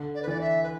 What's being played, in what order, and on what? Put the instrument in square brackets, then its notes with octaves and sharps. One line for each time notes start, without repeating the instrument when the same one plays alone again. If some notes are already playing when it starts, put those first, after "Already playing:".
Already playing: [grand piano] D3
[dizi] D5
B4
[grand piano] E3 [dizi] D5
[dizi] E5
B4